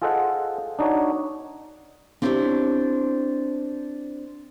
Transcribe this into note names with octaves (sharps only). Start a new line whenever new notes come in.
F4 G#4 A4 C5 D#5 F#5
D4 D#4 F#4 C#5
C4 D4 E4 G4 B4 C#5